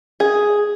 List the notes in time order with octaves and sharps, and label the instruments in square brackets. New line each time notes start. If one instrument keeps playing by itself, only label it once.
[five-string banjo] G#4